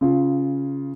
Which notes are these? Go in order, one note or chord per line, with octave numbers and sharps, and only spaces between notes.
C#3 F4